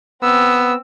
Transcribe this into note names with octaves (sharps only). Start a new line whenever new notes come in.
B3 C4 E6